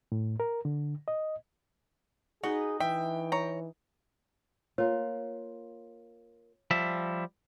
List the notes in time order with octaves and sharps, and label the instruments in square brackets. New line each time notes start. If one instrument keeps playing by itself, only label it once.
[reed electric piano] A2
A#4
D3
D#5
[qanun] D#4 B4 D#5 [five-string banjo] F#4 [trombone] G#4
[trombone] E3 [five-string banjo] E5 [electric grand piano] G5
[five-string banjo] C#5 A#5
[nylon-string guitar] A#3 F4 [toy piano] C#5
[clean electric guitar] F3 G3 E5